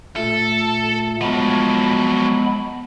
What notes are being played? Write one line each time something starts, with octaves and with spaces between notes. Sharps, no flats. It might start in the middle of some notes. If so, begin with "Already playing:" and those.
A#2 A3 A4
F3 F#3 G#3 B3 B5